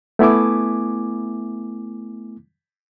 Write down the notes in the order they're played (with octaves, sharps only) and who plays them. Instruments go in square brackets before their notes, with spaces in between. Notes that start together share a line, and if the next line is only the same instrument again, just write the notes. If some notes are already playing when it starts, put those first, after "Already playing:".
[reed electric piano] A3 B3 E4 G#5 D6